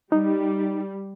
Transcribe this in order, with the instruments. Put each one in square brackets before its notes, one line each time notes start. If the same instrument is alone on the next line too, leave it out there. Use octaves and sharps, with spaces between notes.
[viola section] G3 [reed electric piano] D#4